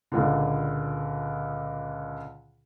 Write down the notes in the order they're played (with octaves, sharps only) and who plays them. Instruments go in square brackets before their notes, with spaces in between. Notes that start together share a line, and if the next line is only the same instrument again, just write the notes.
[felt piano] C#2 A#2 D3